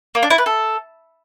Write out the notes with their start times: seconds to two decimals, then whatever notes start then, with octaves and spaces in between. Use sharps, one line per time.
0.15 A#3
0.23 D4
0.30 E4
0.38 B4
0.46 A4